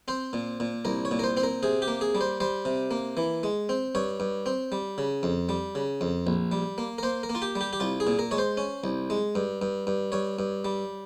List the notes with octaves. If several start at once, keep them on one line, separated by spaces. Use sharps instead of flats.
C4 C5
A#2
A#2
C2 A#4
C#5
A#2
A#4
C5
C4 C5
A#4
C3 G#4
G4
A#3
G#4
G3
C5
G3 C5
C3
A#3
E3
G#3
C4
G2 C#5
G2
C4
G3
C#3
F2
G3
C#3
F2
A#1
G3
A#3
A#4
A#3 C5
A#4
A#3
F4
G4
G3
G4
G4
C2 F4
G#4
A#2
A#4
G#3 C#5
C5
C#4
C2
G#3
G2
G2
G2
G2 C#5
G2
G3